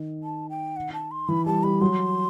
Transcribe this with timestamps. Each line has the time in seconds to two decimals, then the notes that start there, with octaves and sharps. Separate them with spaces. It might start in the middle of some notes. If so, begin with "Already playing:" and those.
Already playing: D#3
0.23 A5
0.50 G5
0.76 F#5
0.93 A5
1.11 C6
1.28 E3 B5
1.46 G3 A5
1.63 G3 B5
1.81 F#3 C6